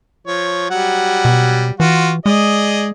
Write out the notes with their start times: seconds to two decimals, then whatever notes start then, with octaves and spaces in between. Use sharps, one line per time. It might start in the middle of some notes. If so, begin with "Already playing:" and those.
0.27 F3 C#5
0.70 F#3 G3 F#5
1.25 B2
1.80 E3 F4 F#4
2.26 G#3 G#4 D5 D#5